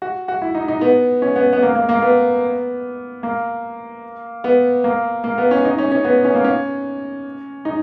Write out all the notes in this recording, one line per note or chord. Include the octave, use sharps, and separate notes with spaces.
F#4
F#4
E4
D#4
D#4
B3
C#4
B3
B3
A#3
A#3
A#3
B3
A#3
B3
A#3
A#3
B3
C#4
D#4
C#4
C#4
B3
C#4
A#3
C#4
D#4